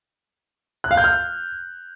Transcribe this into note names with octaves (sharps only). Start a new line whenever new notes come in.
F#6
F5
G6
F6